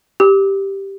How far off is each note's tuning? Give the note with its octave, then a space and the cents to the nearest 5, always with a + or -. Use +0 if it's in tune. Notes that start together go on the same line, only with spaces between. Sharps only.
G4 +0 E6 -40